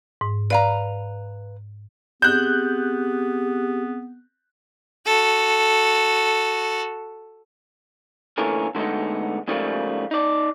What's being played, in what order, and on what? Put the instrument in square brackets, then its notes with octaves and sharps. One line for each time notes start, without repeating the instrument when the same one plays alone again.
[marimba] G#2
[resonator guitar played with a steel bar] B4 F5 A#5 [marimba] D5
[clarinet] B3 [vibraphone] C4 G#4 [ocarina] G4 [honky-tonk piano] F#6 G6
[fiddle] F#4 A4
[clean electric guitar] A#2 D3 E3 A3 C#4 A#4
D3 G#3 A3 B3 D#4
G#2 C#3 F3 G3 A3 A#3
D#4 D5